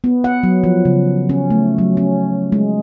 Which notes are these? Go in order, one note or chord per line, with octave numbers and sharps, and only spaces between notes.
B3
F#5
F#3
F3
C#3
C#4
A3
F#3
C#4
G#3